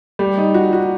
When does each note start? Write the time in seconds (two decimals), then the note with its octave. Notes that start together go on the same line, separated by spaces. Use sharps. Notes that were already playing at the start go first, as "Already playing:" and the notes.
0.19 G3
0.38 D#4
0.54 F#4
0.73 F#4